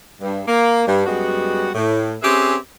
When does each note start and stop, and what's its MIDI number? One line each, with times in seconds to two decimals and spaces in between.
0.21 0.41 43
0.47 0.83 58
0.87 1.03 43
1.06 1.70 42
1.06 1.70 55
1.06 1.70 56
1.06 1.70 59
1.06 1.70 66
1.75 2.14 45
2.23 2.56 60
2.23 2.56 61
2.23 2.56 67
2.23 2.56 68
2.23 2.56 71
2.23 2.56 76